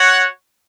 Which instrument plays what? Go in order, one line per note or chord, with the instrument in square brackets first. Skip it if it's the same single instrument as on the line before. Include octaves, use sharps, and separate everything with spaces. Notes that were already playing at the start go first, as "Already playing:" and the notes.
Already playing: [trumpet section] F#4 C#5 F#5